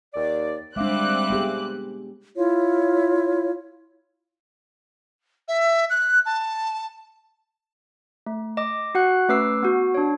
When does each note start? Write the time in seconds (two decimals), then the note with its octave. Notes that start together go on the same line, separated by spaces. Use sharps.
0.13 D#2 D5
0.76 G3 G#3 C4 D4 E5 F5 D6 F#6
1.30 B3 G4 G#4
2.36 E4 F4 C#5
5.48 E5
5.90 F#6
6.25 A5
8.26 A3
8.57 D#5 D6
8.95 F#4 F#5 F#6
9.28 A3 C#4 B4 D6 E6 C7
9.63 B3 F#4
9.94 D4 C#5